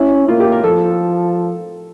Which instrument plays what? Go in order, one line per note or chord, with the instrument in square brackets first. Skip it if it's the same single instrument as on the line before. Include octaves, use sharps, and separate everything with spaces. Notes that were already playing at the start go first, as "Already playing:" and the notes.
Already playing: [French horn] C#4 [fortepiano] E4
[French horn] A#3 [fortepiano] F4
[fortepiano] G4
A#4
[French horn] F3 [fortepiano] A4